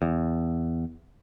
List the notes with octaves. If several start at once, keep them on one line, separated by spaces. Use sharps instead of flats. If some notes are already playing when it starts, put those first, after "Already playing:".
E2